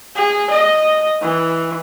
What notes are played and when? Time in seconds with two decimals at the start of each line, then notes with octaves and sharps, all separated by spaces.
0.15 G#4
0.50 D#5
1.21 E3